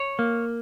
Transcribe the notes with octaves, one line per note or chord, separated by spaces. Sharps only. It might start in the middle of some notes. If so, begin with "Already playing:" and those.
Already playing: C#5
A#3